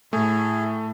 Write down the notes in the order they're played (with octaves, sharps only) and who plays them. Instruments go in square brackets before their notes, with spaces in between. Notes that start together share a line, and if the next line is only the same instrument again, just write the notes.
[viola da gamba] A2 [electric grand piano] A3 [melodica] G#4